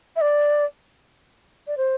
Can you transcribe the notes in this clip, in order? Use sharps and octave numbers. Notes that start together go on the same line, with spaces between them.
E5
D5
D5
C5